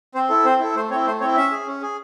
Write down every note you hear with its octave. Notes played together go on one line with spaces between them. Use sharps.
C4 C5
E4 A4
C4 C5
E4 A4
A3 C5
C4 E4 C#5
A3 C5
C4 E4 C#5
C#4 E5
G#4
C#4
G#4